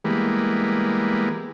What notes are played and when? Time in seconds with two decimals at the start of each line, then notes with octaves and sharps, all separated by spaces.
0.04 E3 G3 G#3 A#3 B3